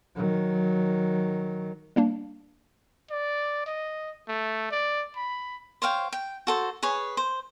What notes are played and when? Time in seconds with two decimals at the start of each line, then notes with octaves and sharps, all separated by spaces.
0.15 D#3 F#3
1.96 G3 A#3 D4
3.11 D5
3.67 D#5
4.29 A3
4.71 D5
5.16 B5
5.82 C5 C#5 F5 G5
6.13 G5
6.47 F#4 A4 C5
6.83 G#4 B4 C#5
7.17 C5